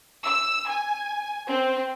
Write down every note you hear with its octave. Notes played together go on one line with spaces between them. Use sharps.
E6
G#5
C4